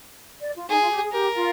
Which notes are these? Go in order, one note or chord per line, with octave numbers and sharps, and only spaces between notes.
D5
F4
D#4 G#4
F4
G4
G#4
G4 A#4
F4